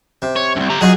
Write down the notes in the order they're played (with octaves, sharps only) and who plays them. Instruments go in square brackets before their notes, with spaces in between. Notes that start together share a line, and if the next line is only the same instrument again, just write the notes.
[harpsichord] C3
[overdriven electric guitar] C#5
C2 F#2
G4 A#5
[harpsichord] F#3 D#4 F4 [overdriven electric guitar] G#4